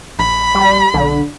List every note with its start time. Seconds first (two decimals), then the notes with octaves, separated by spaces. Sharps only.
0.19 A#1 B5
0.55 G3
0.94 B1 D3